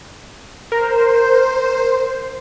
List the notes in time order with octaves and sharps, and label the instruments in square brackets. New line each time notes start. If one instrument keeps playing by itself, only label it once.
[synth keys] A#4 [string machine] C5